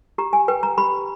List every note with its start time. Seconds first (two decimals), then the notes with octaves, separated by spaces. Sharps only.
0.18 G4 A#5
0.33 G#5
0.48 B4 G5
0.63 A#5
0.78 G4 B5